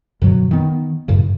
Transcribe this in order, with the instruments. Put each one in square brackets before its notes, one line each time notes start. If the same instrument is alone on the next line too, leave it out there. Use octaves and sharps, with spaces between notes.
[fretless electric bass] F#2 B2 D3 F#3
D#3 B3
F#2 A2 C#3